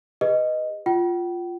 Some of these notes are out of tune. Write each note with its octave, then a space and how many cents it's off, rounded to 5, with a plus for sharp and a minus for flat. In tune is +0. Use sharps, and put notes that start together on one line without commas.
G#4 -45 B4 +0 D#5 +0
F4 +0 G5 -45